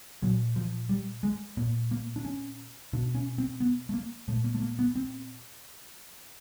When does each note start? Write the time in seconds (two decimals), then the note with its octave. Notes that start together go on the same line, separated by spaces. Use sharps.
0.22 A#2 F#3
0.56 F3
0.89 G3
1.23 G#3
1.57 A#2 A#3
1.91 A#3
2.16 D4
2.25 C#4
2.93 B2 D4
3.15 C#4
3.38 C4
3.60 B3
3.89 A3
3.94 A#3
4.28 A#2 A3
4.44 A#3
4.55 A3
4.62 A#3
4.79 B3
4.95 C4